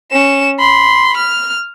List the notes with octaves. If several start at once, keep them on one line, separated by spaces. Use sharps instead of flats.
C#4 E7
B5 C6
F6